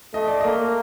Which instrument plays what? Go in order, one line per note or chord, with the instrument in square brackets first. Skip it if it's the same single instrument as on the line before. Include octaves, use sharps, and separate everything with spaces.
[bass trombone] A3 [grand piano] D#5
[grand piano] D5
[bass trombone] A#3 [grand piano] D#5